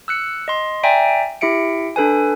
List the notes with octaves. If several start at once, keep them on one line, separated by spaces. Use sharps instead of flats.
E6 F#6 C#7
D#5 C6
D5 E5 G5 G#5 A#5
E4 G4 E5 C#7 D7
D4 A4 B4 G#5